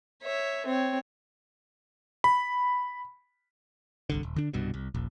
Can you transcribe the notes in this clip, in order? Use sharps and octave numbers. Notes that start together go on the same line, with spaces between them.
C#5 E5
C4 C#5
B5
G1 C2 D3
D#1
D3 D4
C2 G2 B2
C2
D#1 A#1